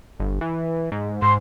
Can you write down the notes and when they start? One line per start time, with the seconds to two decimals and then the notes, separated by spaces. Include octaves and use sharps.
0.20 G1
0.41 E3
0.92 G#2
1.22 G#2 C6